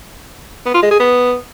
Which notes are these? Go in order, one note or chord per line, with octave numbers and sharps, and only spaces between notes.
B3
F4
G#3
G#4
B3